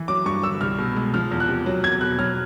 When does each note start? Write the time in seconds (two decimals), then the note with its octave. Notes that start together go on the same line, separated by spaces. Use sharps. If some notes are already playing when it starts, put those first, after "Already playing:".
Already playing: E3
0.08 F#3 D6
0.26 G2 C#6
0.43 D3 E6
0.61 C2 F6
0.78 B2
0.96 G#3
1.14 F3 F6
1.31 E2
1.40 F#6
1.49 C3
1.66 F#3
1.83 E2 G#6
2.01 B2 F#6
2.18 F#3 F6